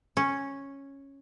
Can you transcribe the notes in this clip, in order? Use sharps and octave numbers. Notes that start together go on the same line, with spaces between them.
C#4